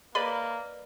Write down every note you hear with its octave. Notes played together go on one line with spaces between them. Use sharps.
A#3 B4 D5 D#5 B5